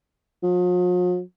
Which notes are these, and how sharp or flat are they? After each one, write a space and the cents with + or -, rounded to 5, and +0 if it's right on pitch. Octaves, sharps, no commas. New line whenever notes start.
F3 +45